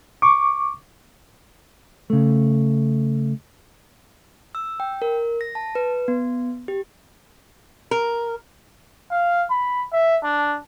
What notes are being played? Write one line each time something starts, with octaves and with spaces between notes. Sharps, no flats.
C#6 D6
C#3 A3
E6
G5
A#4
A#6
A5
B4
B3
G4
A#4
F5
B5
E5
D4